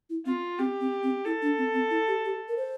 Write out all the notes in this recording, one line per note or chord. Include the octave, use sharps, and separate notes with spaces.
E4
C4 F4
C4 G4
C4
C4
E4 A4
D4
C4
C4
E4
G4
G4
A#4
C5